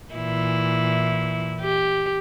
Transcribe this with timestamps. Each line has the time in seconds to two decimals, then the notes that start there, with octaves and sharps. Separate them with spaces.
0.14 A#2 E3 E4
1.61 G4